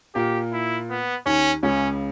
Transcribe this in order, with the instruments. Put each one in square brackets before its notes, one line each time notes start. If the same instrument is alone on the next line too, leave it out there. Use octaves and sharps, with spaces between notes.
[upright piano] A#2 A#3 [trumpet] G4
[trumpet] E4
B3
[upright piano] D#2 D#3 [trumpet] C#4
[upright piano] C#2 C#3 [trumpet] C#4